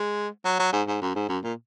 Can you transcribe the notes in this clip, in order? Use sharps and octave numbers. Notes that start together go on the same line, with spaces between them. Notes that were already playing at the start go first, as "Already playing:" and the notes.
Already playing: G#3
F#3
F#3
G#2
G#2
F#2
G#2
F#2
A#2